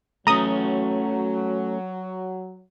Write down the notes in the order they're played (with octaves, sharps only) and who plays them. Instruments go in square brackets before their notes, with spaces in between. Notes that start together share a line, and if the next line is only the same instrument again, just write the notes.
[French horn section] F#3 [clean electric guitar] A3 C#4 [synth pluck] A#5 D#6